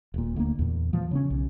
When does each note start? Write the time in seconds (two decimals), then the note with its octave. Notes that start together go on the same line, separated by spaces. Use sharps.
0.14 D#1 A#2
0.36 D2 G3 A#3
0.59 E2 A#2
0.93 A#2 E3 F3
1.11 C#3 C4 C#4
1.30 B1